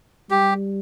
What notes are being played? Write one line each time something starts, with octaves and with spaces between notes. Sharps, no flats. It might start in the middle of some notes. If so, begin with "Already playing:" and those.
G3 G4